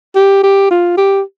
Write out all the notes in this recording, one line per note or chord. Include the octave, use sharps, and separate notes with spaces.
G4
G4
F4
G4